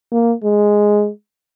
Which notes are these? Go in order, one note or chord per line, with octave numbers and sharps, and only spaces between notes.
A#3
G#3